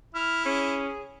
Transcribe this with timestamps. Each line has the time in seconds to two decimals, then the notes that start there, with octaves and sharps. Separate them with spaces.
0.15 E4 F6
0.45 C#4 G#4